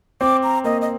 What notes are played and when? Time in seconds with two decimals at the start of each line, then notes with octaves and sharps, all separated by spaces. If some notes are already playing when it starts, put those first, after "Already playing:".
0.21 C4 D6
0.43 A#5
0.64 A#3 D#5
0.81 D#5